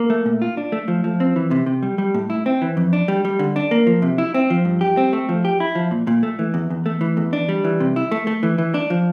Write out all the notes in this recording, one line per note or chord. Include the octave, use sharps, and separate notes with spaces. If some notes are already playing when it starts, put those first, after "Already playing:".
Already playing: A#3
A3
A#2
F4
D4
A3
F3
F3
C4
E3
C3
C3
G3
G3
A2
E4
C4
E3
F2
D4
G3
G3
D3
D4
A#3
F3
C3
E4
C4
F3
G2
G4
C4
A3
F3
G4
E4
F3
A#2
A#2
A3
E3
E2
E2
A3
E3
E2
D4
G3
E3
C3
E4
A3
A3
E3
E3
D4
F3